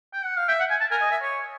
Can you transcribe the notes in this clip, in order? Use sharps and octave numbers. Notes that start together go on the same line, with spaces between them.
G5
F#5
F5
E5 G5
F#5
G#5
A5
A#4 G#5
D#5
E5
C#5